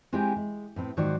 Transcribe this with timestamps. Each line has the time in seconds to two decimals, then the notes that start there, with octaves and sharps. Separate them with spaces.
0.13 G#3 C4 E4 G4 G#4
0.37 G#3
0.76 A2 B3 C4
0.97 G#2 D#3 F#3 F#4 C5 D5